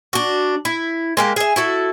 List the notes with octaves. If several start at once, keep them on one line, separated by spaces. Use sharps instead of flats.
D4 F#4
E4
G#3 A#3 G4
G#4 E5
E4 F#4 A4